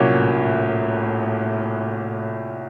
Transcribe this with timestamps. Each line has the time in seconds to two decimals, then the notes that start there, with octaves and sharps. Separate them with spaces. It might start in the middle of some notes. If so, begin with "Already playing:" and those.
Already playing: C2 A#2 F#3 A#3 C#4
0.08 A2
0.38 A2